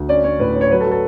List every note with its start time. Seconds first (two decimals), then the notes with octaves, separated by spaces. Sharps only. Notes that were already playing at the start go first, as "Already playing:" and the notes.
Already playing: D2
0.09 C#4 D5
0.24 C#4 C#5
0.39 A2 B4
0.55 C#4
0.61 C#5
0.71 F#3 B4
0.81 A4
0.86 F#3
0.91 A4